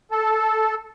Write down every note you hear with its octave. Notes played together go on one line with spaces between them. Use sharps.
A4